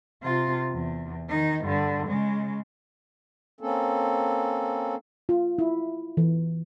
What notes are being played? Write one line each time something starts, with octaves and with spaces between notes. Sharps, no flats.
C3 F4
E2
D#3 D#4
G2 D3
C#3 G#3
A#3 C4 C#4 A4
F4
E4
E3